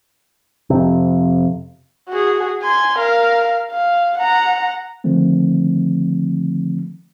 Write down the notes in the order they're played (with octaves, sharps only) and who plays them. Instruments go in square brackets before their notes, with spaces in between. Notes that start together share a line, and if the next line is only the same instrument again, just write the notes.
[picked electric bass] F2 C3
[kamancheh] F#4 G#4
G#5 C6
A#4 F5
F5
F#5 A#5
[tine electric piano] D3 D#3 F3 A3 C4